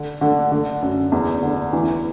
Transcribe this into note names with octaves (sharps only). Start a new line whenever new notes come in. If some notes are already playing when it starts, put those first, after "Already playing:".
Already playing: D3
D3
D3
F#2
E2
D3
E3